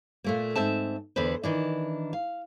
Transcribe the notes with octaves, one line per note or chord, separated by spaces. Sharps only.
A#2 A3 A#3
G#2 C4 E5 A5
E2 D3 B4 C5
D#3 E3 D4
F5